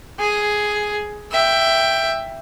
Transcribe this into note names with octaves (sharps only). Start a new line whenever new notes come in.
G#4
E5 G5